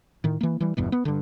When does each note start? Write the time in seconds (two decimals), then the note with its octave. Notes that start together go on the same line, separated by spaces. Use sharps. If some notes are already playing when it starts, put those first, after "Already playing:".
0.24 A2 D#3
0.41 E3 A#3
0.60 E3 G3
0.77 G1 E2 G2 B2
0.92 B3
1.05 G2 D3